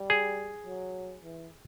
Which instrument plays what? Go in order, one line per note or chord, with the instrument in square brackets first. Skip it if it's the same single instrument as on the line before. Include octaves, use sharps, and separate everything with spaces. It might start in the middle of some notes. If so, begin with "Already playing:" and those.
Already playing: [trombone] G3
[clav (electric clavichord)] G#4
[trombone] F#3
E3